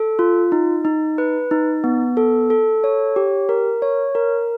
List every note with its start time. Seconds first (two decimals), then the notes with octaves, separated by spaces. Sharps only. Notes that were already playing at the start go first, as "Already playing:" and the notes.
Already playing: A4
0.19 F4
0.52 D#4
0.85 D#4
1.18 B4
1.51 D#4
1.84 B3
2.17 A4
2.50 A4
2.84 C#5
3.16 G4
3.49 A#4
3.82 C#5
4.15 A#4